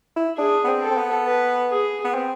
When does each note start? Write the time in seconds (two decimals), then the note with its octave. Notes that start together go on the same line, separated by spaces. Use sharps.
0.16 E4
0.38 D4 G#4
0.64 B3
0.67 C4
0.82 A4
0.91 C4
0.97 B3
1.27 B4
1.71 G#4
2.04 B3
2.14 C4